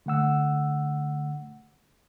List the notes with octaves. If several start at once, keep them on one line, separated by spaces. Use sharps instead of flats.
D3 A3 F#5 E6